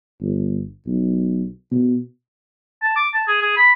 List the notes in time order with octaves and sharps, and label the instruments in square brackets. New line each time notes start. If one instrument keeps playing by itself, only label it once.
[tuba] G1
B1
B2
[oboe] A5
D6
A5
G#4
G#4
B5